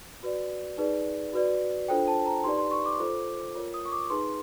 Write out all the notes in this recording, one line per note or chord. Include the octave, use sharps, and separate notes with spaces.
F#4 B4 D5
D#4 G#4 B4 D5
F#4 B4 D5
D4 F4 A4 C5 G5
A5
A#5
D#4 G4 B4 D5 C6
C6
C#6
D6
F4 A4 C5
F4 A#4 C#5
D#6
C#6
D6
D#4 G#4 B4 C6